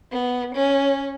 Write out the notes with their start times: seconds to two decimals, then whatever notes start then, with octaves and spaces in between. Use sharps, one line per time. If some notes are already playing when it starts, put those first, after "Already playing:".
0.12 B3
0.55 C#4